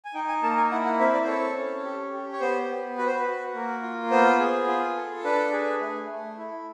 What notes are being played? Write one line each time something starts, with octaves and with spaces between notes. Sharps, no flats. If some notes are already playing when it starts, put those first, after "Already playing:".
G#5
D#4 G5
G#5
A#3 A5
G#5
E4 F#5
F#5
C4 E5
D5
C5
A4 C#5
C#4
G4
G4
C#5
B3 C5
B3
F#4 B4
C5
B4
F#4
A#3
F4
B3 C5
G#4
F4
A4
D4 B4
G#4
A3
A3
E4